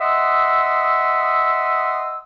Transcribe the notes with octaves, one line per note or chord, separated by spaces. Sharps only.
D#5 E5 F#5 C6 D#6 E6